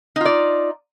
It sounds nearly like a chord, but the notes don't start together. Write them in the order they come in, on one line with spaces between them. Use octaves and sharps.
D#4 F4 D5